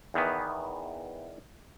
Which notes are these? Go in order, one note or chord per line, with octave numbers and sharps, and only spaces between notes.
E2 D#3 E3 B3